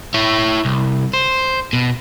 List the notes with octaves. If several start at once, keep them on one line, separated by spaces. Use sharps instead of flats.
E4 C#5
C2
C5
B2